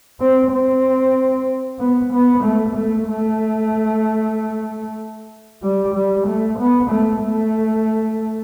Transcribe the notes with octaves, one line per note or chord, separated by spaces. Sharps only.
C4
C4
B3
B3
A3
A3
A3
G3
G3
A3
B3
A3
A3